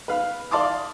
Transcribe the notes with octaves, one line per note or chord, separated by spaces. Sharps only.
B4 F5
D5 F5 A5 C6 D6 D#6